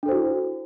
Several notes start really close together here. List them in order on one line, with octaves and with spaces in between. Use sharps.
D4 A4 C5 F#4 E4